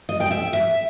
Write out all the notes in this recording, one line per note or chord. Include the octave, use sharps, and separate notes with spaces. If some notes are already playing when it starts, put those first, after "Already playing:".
D#5
G5
E5
E5